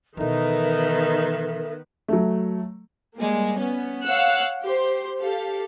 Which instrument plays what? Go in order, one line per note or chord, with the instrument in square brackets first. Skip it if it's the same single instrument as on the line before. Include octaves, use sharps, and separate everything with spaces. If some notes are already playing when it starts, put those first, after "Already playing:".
[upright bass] B2 E3 [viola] D#3 B3 [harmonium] D#4 [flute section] A4 A#4 E5
[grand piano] F#3 A3
[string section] G3 G#3 A#3
B3 C#4
C#5 F5 F#5 E6 F#6 C#7
G4 C5 C6
G4 A4 F5